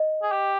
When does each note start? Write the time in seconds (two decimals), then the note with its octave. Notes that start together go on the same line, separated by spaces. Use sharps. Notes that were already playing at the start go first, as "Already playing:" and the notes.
Already playing: D#5
0.23 G#4
0.32 G4